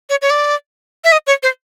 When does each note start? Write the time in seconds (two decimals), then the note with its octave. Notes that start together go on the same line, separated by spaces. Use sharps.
0.10 C#5
0.22 C#5
0.30 D5
1.04 E5
1.12 D#5
1.27 C#5
1.43 C5